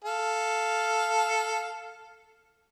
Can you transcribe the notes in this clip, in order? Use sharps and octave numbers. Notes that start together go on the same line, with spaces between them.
A4 F5